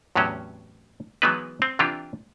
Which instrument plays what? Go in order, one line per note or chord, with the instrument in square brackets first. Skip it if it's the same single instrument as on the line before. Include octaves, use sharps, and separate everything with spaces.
[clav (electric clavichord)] E2 A2 C3 F#3 C#4
E3 F#3 G#3 B3 D#4 B4
C4
C3 E3 D4 F4 G4